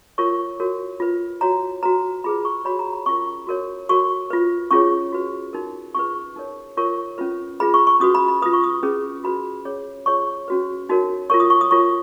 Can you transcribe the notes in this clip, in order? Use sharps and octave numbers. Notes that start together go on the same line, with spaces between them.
F4 A#4 C#5 C#6
F#4 A#4 C#5
F4 B4
F#4 C#5 A#5
F#4 B4 A#5
F4 G#4 B4 B5
C#6
F#4 C#5 B5
A#5
B5
C#4 F4 A#4 C#6
F#4 A#4 C#5
F#4 A#4 C#5 C#6
F4 B4
C#4 F4 G#4 C#5 C#6
F#4 B4
D#4 F#4 A#4
C#4 F4 G#4 B4 C#6
D#4 A#4 C#5
F4 A#4 C#5 C#6
C#4 F4 B4
F4 G#4 B4 B5
C#6
C#6
C#4 F#4 B4 D#6
B5
B5
F4 B4 D#6
C#6
D#6
C#4 G#4 B4
F#4 B4 B5
C#4 G#4 C#5
F4 G#4 C#5 C#6
C#4 F#4 B4
D#4 F#4 A#4 C#5
F4 A#4 C#5 C#6
D#6
C#6
D#6
F4 A#4 C#5 C#6